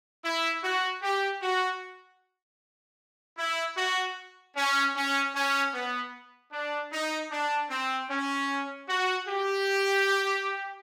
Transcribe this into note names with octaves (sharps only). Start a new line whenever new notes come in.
E4
F#4
G4
F#4
E4
F#4
C#4
C#4
C#4
B3
D4
D#4
D4
C4
C#4
F#4
G4